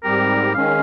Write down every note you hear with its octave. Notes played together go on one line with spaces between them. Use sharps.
G#2 G3 C4 G4 A#4
D#3 G#3 C#4 F5